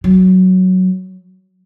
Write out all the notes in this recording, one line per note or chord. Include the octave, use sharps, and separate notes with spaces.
F#3